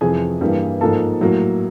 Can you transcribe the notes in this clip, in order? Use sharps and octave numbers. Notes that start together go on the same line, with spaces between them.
F2 C3 E3 G#4 G#5
G2 E3 G3 A#3
G#2 F3 A#3 A4 A5
A2 F#3 A#3